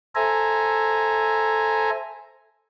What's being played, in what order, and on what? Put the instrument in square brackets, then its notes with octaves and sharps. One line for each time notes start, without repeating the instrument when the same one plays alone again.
[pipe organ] A4 C5 E5 G#5 A#5